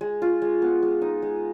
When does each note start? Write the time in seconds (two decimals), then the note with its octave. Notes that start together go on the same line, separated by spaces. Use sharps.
0.01 G#3
0.22 F4
0.42 G#3
0.62 B3
0.83 G#3
1.02 D#4
1.22 G#3